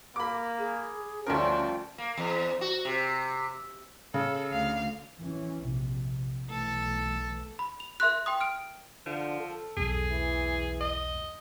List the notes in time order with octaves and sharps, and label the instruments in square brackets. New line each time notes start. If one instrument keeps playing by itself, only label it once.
[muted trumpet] A#3 [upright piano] B5 D6
[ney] G#4
[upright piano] D2 A#4 [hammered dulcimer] F3 G3 A3 [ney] C#4 [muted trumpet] C5
[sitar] A#3
E2
F#4
C3
[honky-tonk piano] C#3 [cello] A4
[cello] D2 F5
[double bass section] E3 C#4
A#1 C3
[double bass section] B1 E3 A3 [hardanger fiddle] A4
[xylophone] B5
F7
A#4 E5 C6 F#6
G5 C6 D#6
F6 D7
[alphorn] D3 [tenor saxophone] F3
[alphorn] A4
[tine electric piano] B1 E2 [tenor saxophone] G#4
[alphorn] E3
[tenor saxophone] D#5